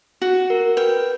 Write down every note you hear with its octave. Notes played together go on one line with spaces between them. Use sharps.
F#4
A#4
B4 G5